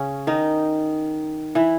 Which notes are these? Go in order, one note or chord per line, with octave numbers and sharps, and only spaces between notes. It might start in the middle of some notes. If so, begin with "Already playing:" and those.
Already playing: C#3 C#4
D#3 D#4
E3 E4